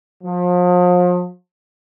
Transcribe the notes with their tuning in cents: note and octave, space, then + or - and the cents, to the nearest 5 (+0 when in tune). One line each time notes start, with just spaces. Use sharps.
F3 +35